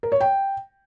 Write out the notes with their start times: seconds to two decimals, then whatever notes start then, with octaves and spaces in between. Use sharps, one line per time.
0.03 A#4
0.12 C#5
0.21 G5